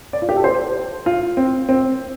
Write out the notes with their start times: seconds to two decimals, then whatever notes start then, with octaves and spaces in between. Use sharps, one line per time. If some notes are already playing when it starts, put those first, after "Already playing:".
0.13 D5
0.22 F4
0.29 G4
0.37 A4
0.44 C5
1.06 F4
1.37 C4
1.69 C4